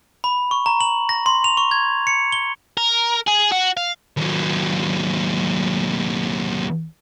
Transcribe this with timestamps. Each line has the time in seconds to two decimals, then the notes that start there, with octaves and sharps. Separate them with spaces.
0.24 B5
0.51 C#6
0.66 A#5
0.81 F#7
1.09 A#6
1.26 C6
1.44 F7
1.57 C#6
1.71 G#6
2.07 C#7
2.32 G7
2.77 A#4
3.28 G#4
3.52 F#4
3.77 F5
4.17 D#2 F#3